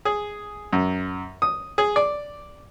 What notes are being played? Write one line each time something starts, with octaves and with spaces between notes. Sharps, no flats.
G#4
F#2
D#6
G#4
D5